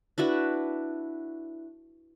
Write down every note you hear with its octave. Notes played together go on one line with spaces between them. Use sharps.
D4 E4 F#4 B4